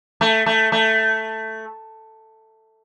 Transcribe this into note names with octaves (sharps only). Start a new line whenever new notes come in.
A3
A3
A3